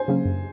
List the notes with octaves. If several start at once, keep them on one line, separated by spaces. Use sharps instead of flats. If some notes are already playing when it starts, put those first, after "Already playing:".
Already playing: C5 G#5
C#3 F#3 A#3 C#4
F#2